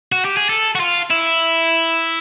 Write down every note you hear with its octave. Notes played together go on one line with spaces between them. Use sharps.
F#4
G4
G#4
A4
F#4
F4
E4